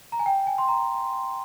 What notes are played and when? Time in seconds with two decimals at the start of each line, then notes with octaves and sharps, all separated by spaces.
0.12 A#5
0.19 G#5
0.26 G5
0.47 G#5
0.58 C6
0.68 A#5